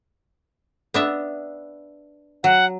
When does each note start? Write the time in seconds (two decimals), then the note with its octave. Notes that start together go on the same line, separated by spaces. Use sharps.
0.94 B3 D4 E5
2.44 F#3 F#5